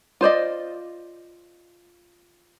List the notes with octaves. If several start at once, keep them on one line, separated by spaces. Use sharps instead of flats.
F4 C5 D5 D#5